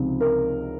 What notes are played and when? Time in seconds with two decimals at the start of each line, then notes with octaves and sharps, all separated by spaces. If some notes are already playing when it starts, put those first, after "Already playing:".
Already playing: C#2 C3 F3 C4 D#4
0.21 A#4